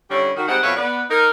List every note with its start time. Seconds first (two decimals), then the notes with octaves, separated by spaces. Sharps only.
0.11 D3 G3 C#4 D4 E4 C#5
0.36 D#3 F#4
0.48 G3 G#3 C4 D#4 F#5
0.63 F2 B2 B4 C#5 E5 F5
0.76 B3 B4 D5
1.10 D#4 A#4